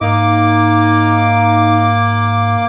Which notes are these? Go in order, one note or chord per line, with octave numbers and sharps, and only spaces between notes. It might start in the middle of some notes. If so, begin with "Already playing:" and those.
G#2 A#3 D#4 D6